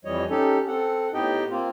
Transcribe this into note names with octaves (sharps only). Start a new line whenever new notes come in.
F2 E3 G3 C#5 D#5
C#4 D#4 G4 A4
C4 A4 F#5
A2 B3 D#4 G4 D#5 G5
A#3 C4 F4